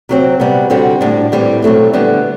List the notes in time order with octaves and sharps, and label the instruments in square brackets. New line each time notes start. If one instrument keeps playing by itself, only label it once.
[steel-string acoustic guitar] C3 F#3 C4
C3 G3 B3
D3 G3 C4 F#4
A2 G3 D4
A2 E3 G3 C4
B2 F#3 A3 C4
D3 G3 B3